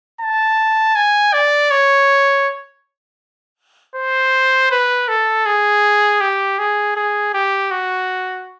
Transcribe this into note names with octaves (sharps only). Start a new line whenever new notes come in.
A5
G#5
D5
C#5
C5
B4
A4
G#4
G4
G#4
G#4
G4
F#4